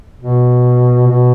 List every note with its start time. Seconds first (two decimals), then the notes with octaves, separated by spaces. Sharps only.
0.19 B2
1.07 B2